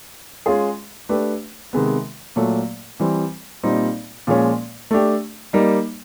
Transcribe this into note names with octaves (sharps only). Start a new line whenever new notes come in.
G#3 C#4 F4 G#4
A3 D4 G4 B4
C3 D#3 G#3 B3
A#2 F#3 A3
E3 G3 C4
A#2 G3 C4 D#4
A#2 F3 G#3 C#4
A3 D4 G4
G3 A#3 D#4